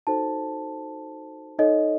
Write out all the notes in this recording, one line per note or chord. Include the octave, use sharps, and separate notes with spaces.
D#4 F#4 A4 C5 A5
D#4 A4 C#5 D#5